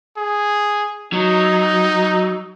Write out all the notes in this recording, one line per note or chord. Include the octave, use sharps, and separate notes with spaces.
G#4
F#3 D#4